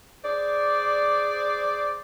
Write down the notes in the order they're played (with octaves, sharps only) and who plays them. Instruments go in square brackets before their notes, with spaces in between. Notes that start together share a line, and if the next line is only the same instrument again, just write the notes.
[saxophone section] G#4 C5 D5